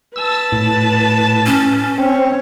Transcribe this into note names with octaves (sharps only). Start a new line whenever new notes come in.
B4 A5 E6
A2
C#4
C4 C#5